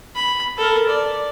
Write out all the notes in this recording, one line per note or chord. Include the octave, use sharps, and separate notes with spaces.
B5
A4 A#4
D5